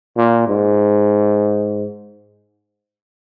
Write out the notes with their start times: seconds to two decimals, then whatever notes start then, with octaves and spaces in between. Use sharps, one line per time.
0.17 A#2
0.48 G#2